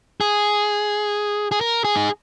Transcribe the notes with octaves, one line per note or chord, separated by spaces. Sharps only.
G#4
G#4
A#4
G#4
D#4